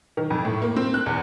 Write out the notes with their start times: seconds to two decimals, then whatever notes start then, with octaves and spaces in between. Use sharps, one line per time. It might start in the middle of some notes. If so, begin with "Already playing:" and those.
0.17 D#3
0.30 F2
0.45 A2
0.62 A#3
0.76 C4
0.94 F#6
1.06 E2